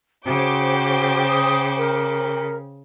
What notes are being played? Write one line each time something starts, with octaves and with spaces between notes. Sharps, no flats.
C#3 F#4 C5 G5 D6
D#6
A#4